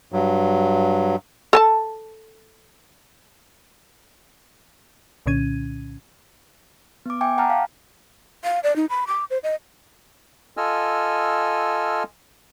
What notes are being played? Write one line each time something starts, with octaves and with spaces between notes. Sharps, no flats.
G2 F#3
A4 G#5 A5
C2 A#2 D3 C#4 G#6 D#7
B3 D6
E5 G5 G#5 D6
F#5 G5 A5 A#5 F6
F5
F5
D5
D#4
B5
D6
C5
D#5
F4 A4 D#5 G#5 E6 F6